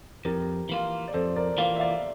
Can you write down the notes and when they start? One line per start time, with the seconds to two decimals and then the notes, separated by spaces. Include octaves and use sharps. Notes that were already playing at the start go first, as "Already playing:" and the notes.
0.25 F2 G4 A#4
0.69 E3 A#3 F4
1.08 D5
1.14 F2 A4 C5
1.36 A#4 D5
1.58 E3 A#3 F4 D5 F5
1.76 E5
1.80 D5 F5